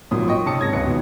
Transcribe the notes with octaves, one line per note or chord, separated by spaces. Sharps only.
G#1 A#2 F3 F#3 D#6
D#5 G5 C#6
C3 C#4 G4 A5 D#6 C#7
G#2 C#4 G#6 A#6
D1 C#2 B4 C#7
B2 D#3